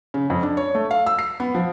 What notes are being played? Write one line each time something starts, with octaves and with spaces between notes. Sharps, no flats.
C#3
F2
D4
C#5
A3
F5
E6
C7
B3
F3